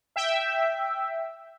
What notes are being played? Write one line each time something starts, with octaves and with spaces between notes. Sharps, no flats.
E5 G5